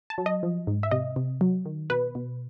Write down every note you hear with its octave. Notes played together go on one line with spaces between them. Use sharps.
A5
F#3
D#5
F3
G#2
E5
C3 D#5
C3
F#3
D#3
B2 B4
B2